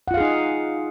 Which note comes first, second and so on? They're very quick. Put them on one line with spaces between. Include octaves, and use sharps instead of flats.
F#5 F4 F5 G#4 D#4